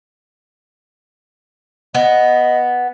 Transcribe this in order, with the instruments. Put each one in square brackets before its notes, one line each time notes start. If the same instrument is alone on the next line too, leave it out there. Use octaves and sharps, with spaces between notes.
[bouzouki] B3 [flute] D#5